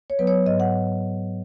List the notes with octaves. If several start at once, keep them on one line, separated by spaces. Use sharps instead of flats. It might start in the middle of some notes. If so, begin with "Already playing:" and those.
C#5
F#3 B3 B4
C#5
G#2 D#5
F#5